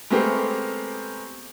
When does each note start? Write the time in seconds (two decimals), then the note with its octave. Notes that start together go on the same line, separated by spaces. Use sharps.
0.10 G#3 A3 B3 C4 G4 A#4